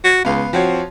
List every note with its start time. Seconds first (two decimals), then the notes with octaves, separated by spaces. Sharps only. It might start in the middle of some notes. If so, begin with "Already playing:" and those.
0.04 F#4
0.25 C#2 B3 F5
0.53 F3 C4 F#4 C#5